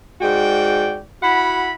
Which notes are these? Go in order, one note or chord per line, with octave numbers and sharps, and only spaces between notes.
G#2 G#3 F#4 D5 G5
E4 F#4 F#5 B5